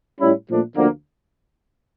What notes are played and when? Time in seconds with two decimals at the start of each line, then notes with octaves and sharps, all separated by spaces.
0.21 A2 G3 C#4 E4
0.49 A#2 F3 A3 D4
0.77 D2 D3 F3 A#3